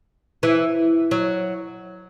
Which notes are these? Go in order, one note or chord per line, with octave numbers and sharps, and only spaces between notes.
E3
F#3